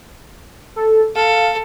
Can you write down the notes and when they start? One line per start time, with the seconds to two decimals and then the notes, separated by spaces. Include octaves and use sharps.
0.76 A4
1.15 A4 F5